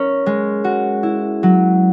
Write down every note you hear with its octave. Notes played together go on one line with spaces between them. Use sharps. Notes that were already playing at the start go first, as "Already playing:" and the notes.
Already playing: C#4 A#4
G#3
F#4
E4
F#3